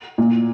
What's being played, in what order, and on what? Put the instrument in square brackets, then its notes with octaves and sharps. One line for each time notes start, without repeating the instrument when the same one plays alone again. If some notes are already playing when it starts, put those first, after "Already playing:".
[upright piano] A#2